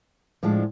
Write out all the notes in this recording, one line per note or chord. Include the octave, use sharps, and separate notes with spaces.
A2 F3 G#3 D4